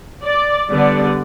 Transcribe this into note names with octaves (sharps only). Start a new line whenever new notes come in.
D5
D3 G3 B3 D4 D5